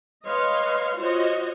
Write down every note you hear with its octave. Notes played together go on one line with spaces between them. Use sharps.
B4 C#5 D#5 F5 C6
F4 F#4 C5 C#5 D#5